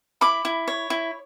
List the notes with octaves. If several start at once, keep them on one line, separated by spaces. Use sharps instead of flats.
E4 B5 D6
E4
C#5
E4